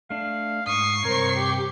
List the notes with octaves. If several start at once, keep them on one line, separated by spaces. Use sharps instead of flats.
A3 D4 F5
G#2 C#6 D#6 C7
G2 C3 A#4 C5 C#5
G4